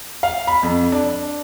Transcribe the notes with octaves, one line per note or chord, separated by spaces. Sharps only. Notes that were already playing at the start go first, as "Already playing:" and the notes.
F5
B5
F2
D4